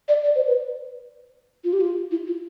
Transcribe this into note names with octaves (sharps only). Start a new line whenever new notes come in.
D5
D5
C5
B4
F4
G4
F4
E4
F4